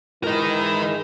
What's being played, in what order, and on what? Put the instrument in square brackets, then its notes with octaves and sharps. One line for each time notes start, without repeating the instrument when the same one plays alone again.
[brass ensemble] G#2 E3 G#3 [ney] E4 [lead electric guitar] A#4 D#5